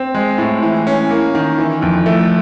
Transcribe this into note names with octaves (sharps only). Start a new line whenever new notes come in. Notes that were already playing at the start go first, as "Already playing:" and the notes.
Already playing: C4
G#3
A2
E3
C#4
A#3
D#3
E3
F2
A3